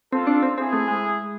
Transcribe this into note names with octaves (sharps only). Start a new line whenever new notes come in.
C4 F4 A4
D4
C4
C4 E4 G#4
A3
G#3